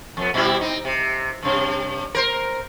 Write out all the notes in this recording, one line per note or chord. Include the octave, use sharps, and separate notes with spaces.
F2 B3
B2 G3 E4
C4 D#4
C3
G2 C3
A#4 C5